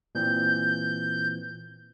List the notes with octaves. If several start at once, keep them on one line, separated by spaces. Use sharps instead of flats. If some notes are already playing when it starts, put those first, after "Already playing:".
A#2 E3 C4 G6